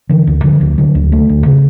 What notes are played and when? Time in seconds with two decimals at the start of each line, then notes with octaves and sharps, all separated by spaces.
0.09 D3 E3
0.27 D2
0.44 D3 F3
0.61 D2
0.78 D3 F#3
0.95 D2
1.12 D3 A3
1.29 D2
1.46 C#3